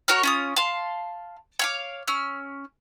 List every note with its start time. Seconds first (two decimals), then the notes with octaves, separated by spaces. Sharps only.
0.08 F#4 A#4 C#5 F6
0.23 C#4 F4 D#6
0.56 F5 A5 C6
1.59 C#5 F5 D6
2.08 C#4 E6 F6